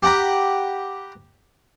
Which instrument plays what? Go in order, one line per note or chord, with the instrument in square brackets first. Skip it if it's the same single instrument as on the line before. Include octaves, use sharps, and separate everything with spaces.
[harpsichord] G4 F#5 G5 A#5 B5